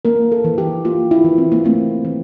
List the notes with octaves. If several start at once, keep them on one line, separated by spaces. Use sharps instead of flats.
A#3 A#4
A4
E3
G4
A#3 F4
E4
E3
C4
A#3
A3 C4
E3